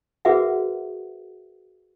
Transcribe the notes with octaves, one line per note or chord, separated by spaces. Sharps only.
F#4 G#4 A#4 B4 E5 F#5